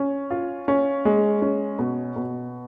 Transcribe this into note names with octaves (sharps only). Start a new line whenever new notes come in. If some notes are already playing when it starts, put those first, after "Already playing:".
Already playing: C#4
F4
C#4
G#3
C#4
B2
B2